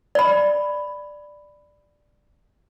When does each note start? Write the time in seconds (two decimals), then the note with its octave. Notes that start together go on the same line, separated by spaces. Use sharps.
0.15 D5 B5